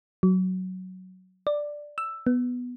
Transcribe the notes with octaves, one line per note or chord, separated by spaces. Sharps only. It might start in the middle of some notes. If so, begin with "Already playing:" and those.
F#3
D5
E6
B3